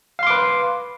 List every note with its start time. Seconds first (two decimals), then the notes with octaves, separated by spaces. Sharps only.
0.19 F5
0.23 C6
0.27 D6
0.30 B4